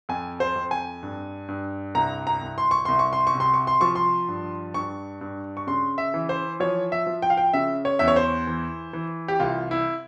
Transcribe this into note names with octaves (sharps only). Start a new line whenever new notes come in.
F2 G#5
C5
F2
G#5
G2
G2
C2 A#5
A#5
C2
C6
C#6
C2 C6
C#6
C6
C#6
C3
C6
C#6
C6
F3 C#6
C6
G2
G2 C#6
G2
C#6
C#3 C6
E5
E3
C5
F3 C#5
E5
F3
G5
F5
G5
C#3 E5
C#5
E2 E5
C#5
C5
E3
E3
G4
C2 F4
E4